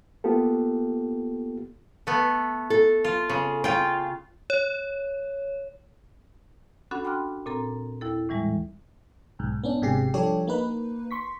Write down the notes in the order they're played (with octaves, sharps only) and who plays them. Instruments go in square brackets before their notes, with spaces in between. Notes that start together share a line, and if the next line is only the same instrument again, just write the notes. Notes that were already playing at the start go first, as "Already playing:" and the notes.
[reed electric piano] A#3 B3 F4 G4 A4
[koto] A3 B3
[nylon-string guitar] A4
[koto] F4
C#3
[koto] C#3 F4 [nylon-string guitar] G5
[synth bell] C#5
[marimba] C#4 D4 F#4 A4 F#5 B5
G5 B5 C6 D6 F6 F#6
A#2 C4 A4 A#5
D#2 E4 A4
A2 E3 G3 G#3
[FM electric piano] B1 G#2
B3 C#4 D4
G#1 G#2 C3 G4 G#4 C7
F3 G3 D4 G4 A4 C#5
A#3 D#4 B4
C6 C#6 B6